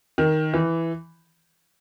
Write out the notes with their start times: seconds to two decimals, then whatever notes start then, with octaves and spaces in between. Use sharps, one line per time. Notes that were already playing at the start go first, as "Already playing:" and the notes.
0.18 D#3
0.54 E3